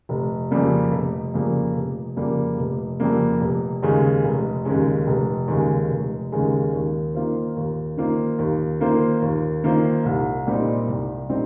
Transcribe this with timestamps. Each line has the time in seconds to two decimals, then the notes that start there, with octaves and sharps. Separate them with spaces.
0.09 F1
0.51 F2 C#3 G3 A#3
0.92 F1
1.34 F2 C#3 G3 A#3
1.75 F1
2.16 F2 C#3 G3 A#3
2.58 F1
3.00 F2 C#3 G3 A#3
3.41 F1
3.83 D#2 C#3 G#3 C#4
4.24 F1
4.65 D#2 C#3 G#3 C#4
5.07 F1
5.48 D#2 C#3 G#3 C#4
5.90 F1
6.32 D#2 C#3 G#3 C#4
6.73 D#2
7.14 D#3 A#3 F4 C5
7.56 D#2
7.97 D#3 A#3 F4 C5
8.39 D#2
8.80 D#3 A#3 F4 C5
9.22 D#2
9.64 D#3 A#3 F4 C5
10.05 C2
10.47 A#2 G3 C4 D#4
10.87 C2
11.29 A#2 G3 C4 D#4